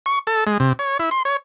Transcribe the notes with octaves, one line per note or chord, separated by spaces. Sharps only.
C#6
A4
G#3
C3
C#5
E4
C6
C#5